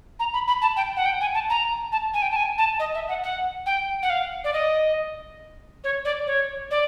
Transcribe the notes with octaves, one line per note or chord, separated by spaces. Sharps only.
A#5
B5
B5
A5
G5
F#5
G5
G#5
A5
A#5
A5
G#5
G5
A5
G#5
A5
D#5
E5
F#5
F#5
G5
F#5
F5
D5
D#5
C#5
D5
C#5
D5